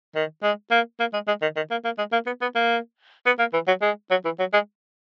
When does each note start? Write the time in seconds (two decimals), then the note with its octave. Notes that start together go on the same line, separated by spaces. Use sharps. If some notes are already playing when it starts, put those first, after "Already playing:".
0.15 D#3
0.43 G#3
0.71 A#3
1.00 A#3
1.13 G#3
1.27 G#3
1.42 D#3
1.56 D#3
1.71 A#3
1.84 A#3
1.98 G#3
2.12 A#3
2.26 B3
2.41 B3
2.55 A#3
3.26 B3
3.39 A#3
3.53 E3
3.68 F#3
3.82 G#3
4.11 F#3
4.25 E3
4.39 F#3
4.53 G#3